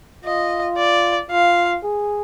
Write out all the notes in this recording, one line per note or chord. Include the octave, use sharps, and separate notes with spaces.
F4 D#5
D5
F4 F5
G#4